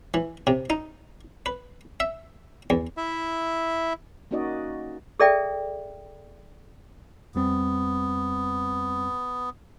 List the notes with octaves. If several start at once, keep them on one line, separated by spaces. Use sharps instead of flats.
E3
C3
D#4
B4
E5
E2
E4 E5
A#3 C#4 D#4 F#4 D5 D#5
G#4 A4 D5 E5 G5
F2 G3 B3 C4